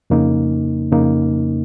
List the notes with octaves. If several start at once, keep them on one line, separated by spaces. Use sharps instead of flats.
F2 C#3 A#3 D#4
F2 C#3 A#3 D#4